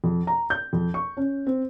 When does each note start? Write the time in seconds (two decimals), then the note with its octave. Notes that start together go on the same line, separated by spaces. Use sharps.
0.04 F2
0.27 A#5
0.50 G6
0.73 F2
0.94 C#6
1.17 C#4
1.47 C4